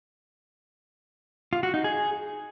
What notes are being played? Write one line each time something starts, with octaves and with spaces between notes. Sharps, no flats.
F4
F#4
D#4
G#4